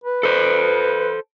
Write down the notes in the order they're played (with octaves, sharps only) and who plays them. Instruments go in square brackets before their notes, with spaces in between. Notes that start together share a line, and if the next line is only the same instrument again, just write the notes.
[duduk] B4
[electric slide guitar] A4 C5